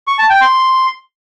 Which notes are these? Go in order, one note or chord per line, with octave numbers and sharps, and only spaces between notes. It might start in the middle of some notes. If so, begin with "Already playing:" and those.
C#6
A5
G5
C6